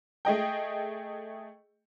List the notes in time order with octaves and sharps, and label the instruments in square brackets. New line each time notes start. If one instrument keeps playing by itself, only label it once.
[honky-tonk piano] A3 G#4 D#5 G5